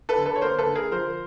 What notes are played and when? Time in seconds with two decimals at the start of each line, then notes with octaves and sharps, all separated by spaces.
0.09 A4 B4
0.18 D3
0.25 A4 B4
0.36 C#5
0.42 A#3 A#4 C5
0.58 A4 B4
0.66 D3
0.76 G#4 A#4
0.91 F3 A#4 C5